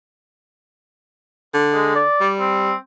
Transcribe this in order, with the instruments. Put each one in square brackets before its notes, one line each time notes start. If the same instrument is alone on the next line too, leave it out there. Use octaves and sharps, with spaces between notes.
[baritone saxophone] D3
[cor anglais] G#3
D5
[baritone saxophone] G3
[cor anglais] C4